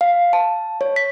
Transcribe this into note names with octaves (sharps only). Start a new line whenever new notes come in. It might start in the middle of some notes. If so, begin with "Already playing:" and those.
F5
A5
C#5
B6